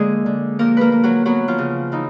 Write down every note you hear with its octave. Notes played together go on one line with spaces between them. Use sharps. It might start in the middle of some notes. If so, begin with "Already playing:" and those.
Already playing: D3 F3 G#3 A#3 G#4
D3
F3 A#3 A#4
A#3 A#4 B4
A#3
F#3 F#4
F#3 B3 F#4
F3 F4
C#3
E3 D#4